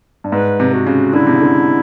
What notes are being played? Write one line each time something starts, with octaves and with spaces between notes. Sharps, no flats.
G2
G#2 B4
C3
F#4
C#3
D3 E4
C3
C#3
D3